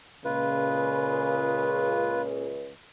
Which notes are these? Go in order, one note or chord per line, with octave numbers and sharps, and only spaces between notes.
C#2 A#2 C#3 F4 B4